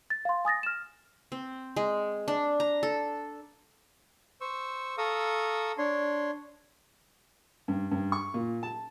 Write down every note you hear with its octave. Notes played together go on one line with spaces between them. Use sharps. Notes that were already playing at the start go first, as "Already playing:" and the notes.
A6
F5 C6
G#5 D#6 A6 A#6
F6 E7
C4
G#3
D4
A#5
A4
C5 C#6 E6
A4 F5 A#5 C#6 D#6 E6
D4 C#5 C6
G2
G2
C#6
A#2
A5